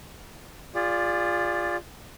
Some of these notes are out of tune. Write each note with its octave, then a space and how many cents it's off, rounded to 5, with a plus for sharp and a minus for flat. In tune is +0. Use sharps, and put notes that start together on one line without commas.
F4 +0 G#4 -35 D5 +0